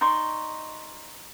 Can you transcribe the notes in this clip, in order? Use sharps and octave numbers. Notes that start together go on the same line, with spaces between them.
D#4 D5 C6 C#6